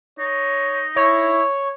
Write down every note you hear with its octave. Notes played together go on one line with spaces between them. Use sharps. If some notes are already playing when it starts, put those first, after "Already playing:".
D#4 C#5
E4 C#5